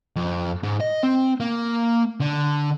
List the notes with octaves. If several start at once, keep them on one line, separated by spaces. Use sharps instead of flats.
F2
G#2
D#5
C4
A#3
D3